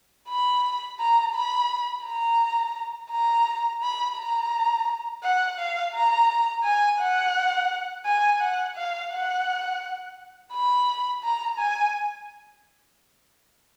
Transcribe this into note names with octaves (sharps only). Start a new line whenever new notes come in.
B5
A#5
B5
A#5
A#5
B5
A#5
F#5
F5
A#5
G#5
F#5
G#5
F#5
F5
F#5
B5
A#5
G#5